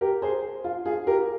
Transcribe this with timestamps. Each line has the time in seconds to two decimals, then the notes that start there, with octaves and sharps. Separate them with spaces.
0.01 G4 A#4
0.22 G#4 C5
0.64 F4
0.86 F4 G#4
1.07 G4 A#4